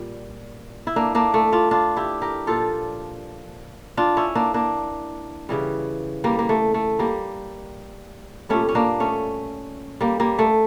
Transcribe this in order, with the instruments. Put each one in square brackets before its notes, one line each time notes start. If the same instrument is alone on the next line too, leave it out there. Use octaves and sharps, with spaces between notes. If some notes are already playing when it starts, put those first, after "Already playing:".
Already playing: [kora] A#2 G3
E4
A#3 D4
A#3 D4
A3
D4 F4
D4 F4
E4 G4
G4 A#4
A#2 F3 F4 A4
D4 F4
C#4 E4
A#3 D4
A#3 D4
C#3 E3 G3
G3 A#3
A#3
A3
A3
G3 A#3
A#2 G3 A3 C#4
C#4
A#3 D4
A3 C#4
G3 A#3
G3 A#3
A3